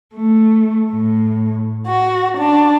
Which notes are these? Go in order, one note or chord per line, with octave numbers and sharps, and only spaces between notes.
A3
A2
F#4
D4